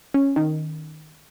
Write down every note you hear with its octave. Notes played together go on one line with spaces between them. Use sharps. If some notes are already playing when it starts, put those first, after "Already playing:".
C#4
D#3